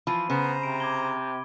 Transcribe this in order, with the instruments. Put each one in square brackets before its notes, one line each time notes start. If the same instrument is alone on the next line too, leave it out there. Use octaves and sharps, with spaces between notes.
[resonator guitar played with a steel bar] E3 F3 F4 [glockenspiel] B5 D#7
[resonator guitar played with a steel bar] C#3 [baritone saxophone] B3 [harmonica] C5 A#5
[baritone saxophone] C3 [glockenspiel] D7
[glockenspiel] D6 G#6 G7